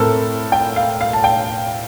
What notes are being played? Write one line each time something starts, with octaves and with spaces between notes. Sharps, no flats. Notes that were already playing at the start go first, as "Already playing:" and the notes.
Already playing: A2 A3 C4 A4 A#4
G5
F5
F5
A5
G5